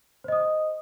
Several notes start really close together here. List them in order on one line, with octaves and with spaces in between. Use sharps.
C5 D#5 D#6